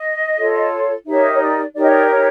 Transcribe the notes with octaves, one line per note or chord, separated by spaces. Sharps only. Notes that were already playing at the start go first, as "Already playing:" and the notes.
Already playing: D#5
F4 A4 C#5
D#4 G4 A#4 C#5 E5
C#5
D5
D#4 G4 A#4 C#5 D5
D#5
D5
C#5